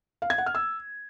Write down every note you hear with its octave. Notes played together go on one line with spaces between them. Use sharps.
F5
G#6
F#5
F6
E6